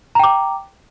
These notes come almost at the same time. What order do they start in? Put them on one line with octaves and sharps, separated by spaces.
A#5 G5 D6